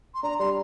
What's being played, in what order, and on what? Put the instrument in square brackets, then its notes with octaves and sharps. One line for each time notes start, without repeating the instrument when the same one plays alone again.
[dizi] C6
[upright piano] D4 [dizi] A#5
[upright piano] G3 [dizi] C6